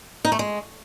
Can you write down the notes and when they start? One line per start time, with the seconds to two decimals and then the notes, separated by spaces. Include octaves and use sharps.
0.25 D#4
0.32 A3
0.39 G#3